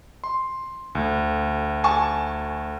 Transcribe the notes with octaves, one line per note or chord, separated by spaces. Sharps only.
C6
D2
G#5 A5 C#6